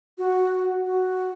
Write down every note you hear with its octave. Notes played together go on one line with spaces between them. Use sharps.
F#4
F#4